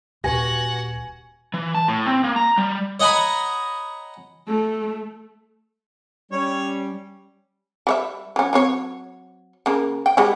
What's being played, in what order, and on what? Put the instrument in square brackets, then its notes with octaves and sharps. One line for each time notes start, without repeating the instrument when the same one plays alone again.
[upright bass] D#1 [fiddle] F#4 F#5 [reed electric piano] G4 B4 [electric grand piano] G#5 A#6
[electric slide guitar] E3
A5
A2
C4
A#3
A#5
G3
[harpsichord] C#5 D#5 F#5 G#5 A#5 B5
[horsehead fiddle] A3
[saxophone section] G3 [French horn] C#4 [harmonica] C#5
[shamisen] G3 C#5 E5
F#3 C#4
F#3 C4 C#5
C#3 A#3
G5
G3 G#3 F#4